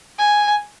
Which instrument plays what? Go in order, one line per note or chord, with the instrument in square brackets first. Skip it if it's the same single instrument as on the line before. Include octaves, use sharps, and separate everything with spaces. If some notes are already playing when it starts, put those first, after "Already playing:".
[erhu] G#5